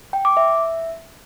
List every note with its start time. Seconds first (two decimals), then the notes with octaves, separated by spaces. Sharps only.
0.13 G5
0.25 D6
0.37 E5